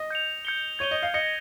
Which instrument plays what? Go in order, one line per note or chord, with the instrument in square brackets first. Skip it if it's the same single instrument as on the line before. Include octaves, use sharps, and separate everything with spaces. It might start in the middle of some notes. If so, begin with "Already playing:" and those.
Already playing: [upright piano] D#5
[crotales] G6 C#7 F7
G6 C#7 G7
[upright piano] C#5 [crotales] G#6 D#7 G7
[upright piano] D#5
F5
[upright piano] D#5 [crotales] D#6 A#6 C#7 G7